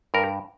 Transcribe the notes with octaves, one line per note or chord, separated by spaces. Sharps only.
G2 A#4